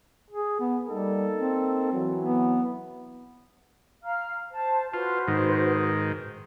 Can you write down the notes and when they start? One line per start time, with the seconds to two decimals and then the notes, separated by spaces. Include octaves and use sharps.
0.31 G#4
0.60 B3
0.89 G3 A#3 D#4 A4
1.38 C4
1.93 E3 F#3
2.22 B3
4.04 F5 A#5 F6
4.52 C5 A5
4.94 F4 F#4 B4 C5
5.28 G#2 D#3